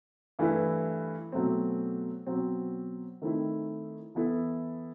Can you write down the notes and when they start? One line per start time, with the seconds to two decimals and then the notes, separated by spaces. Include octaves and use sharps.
0.39 G2 E3 A3 E4 B4
1.32 B2 F#3 A3 C4
2.27 B2 F#3 C4 F#4
3.22 D#3 A3 C4 E4
4.15 E3 B3 E4 A4